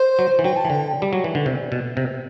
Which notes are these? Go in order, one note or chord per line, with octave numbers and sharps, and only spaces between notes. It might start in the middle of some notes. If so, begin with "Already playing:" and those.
Already playing: C5
F#3
E3
F#3 G5
A5
E3
D3 G5
G3
F#3
E3
D3
C3
B2
C3